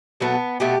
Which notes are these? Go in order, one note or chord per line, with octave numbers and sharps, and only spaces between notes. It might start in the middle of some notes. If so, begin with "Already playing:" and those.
B2 F#3 A3 B3
B2 F#3 A3 G4